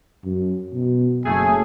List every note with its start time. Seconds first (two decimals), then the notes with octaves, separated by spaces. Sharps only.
0.25 F#2
0.73 B2
1.25 F#1 F#2 A3 G#4 G#5